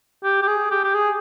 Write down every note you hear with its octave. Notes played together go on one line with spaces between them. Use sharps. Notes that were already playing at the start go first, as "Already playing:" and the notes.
G4
G4
G#4
G4
G4
G#4